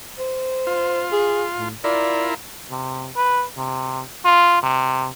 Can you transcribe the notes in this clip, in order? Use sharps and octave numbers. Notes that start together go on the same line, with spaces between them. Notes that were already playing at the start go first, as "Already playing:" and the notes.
C5
F4
G#4
A2
E4 F4 A#4 D5
C3
B4
C3
F4
C3